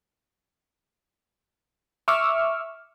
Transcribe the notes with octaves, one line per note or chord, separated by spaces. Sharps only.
E5 C#6 D6 E6 F6